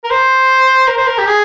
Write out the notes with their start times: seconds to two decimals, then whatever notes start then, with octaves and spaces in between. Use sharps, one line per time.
0.04 A#4
0.10 C5
0.88 A#4
0.97 C5
1.07 A#4
1.18 G4
1.27 G#4